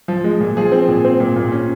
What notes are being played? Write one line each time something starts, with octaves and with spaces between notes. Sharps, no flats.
F3
G#3
A#2
F3 G#4
C4
A#2
C4
A#2
A#2
C#4